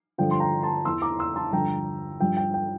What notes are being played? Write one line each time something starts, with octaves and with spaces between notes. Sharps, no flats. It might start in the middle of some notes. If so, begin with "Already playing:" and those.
G2 D3 F3 G5
C6
G5 A#5
A5 C6
E2 E3 C6 E6
A#5 D6
C6 E6
A5 C6
G2 D3 F3 G5 A#5
G2 F3 G5
G5
G5